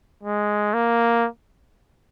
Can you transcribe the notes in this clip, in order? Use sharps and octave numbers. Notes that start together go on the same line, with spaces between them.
G#3
A#3